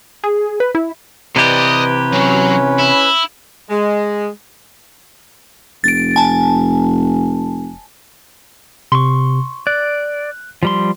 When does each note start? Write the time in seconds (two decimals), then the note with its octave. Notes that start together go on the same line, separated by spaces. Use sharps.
0.24 G#4
0.60 B4
0.75 E4
1.36 C3 E3 G4 B4 D5 D#5
2.12 F#3 C#4
2.78 E4
3.69 G#3
5.84 F1 A6 D7
6.16 G#5 A5
8.92 C3 C6 C#6
9.67 D5 F#6
10.63 F3 G3 C6